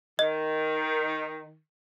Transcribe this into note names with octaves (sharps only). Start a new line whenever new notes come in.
D#3 D#5